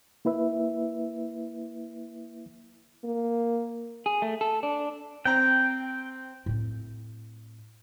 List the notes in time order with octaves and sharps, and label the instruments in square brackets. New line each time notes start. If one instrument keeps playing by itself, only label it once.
[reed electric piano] A#3 E4 B4 E5
[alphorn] A#3
[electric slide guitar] G#4
A3
A4
D4
[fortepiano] C4 A#5 [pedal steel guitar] G5
[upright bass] A2 C4